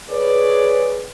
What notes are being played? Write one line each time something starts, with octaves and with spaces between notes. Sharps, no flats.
G#4 B4 C#5 D5